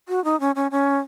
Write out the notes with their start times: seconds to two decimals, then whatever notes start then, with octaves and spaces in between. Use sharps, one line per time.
0.08 F#4
0.24 D#4
0.40 C#4
0.55 C#4
0.71 C#4